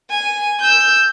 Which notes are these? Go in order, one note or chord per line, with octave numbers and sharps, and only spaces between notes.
G#5
E6 G6